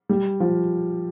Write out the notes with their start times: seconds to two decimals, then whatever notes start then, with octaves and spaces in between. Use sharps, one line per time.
0.09 G3
0.40 F3